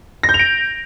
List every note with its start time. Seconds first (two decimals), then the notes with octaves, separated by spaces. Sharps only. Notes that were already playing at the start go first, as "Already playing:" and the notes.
0.23 A#6
0.29 G6
0.34 F7
0.39 D7